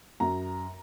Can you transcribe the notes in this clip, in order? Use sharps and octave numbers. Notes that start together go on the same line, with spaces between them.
F#2 A#5